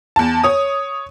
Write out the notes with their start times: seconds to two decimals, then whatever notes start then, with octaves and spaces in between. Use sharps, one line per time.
0.16 E2 A5
0.44 C#5 D#6